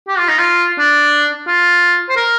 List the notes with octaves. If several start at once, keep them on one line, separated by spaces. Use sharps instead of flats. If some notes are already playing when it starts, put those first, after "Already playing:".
G4
F4
D#4
F4
D4
F4
C5
A#4